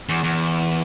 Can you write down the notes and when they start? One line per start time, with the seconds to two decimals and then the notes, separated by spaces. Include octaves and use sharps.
0.09 E2
0.24 E2